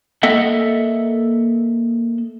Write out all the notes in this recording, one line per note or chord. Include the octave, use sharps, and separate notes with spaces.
A#3 A4 D#5 E5 F#5